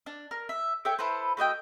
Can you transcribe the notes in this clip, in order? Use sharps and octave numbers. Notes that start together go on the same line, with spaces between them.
D4
A#4
E5
A4 C#5 E5 G5
E4 A4 B4 C5
A3 F#4 D#5 G5